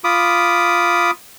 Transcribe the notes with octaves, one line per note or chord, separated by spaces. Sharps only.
F4 B5 D6 D#6